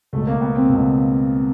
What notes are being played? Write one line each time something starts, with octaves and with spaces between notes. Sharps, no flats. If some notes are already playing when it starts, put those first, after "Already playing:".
C#2 B2 A3
A#3
B3
C4
C#2 B2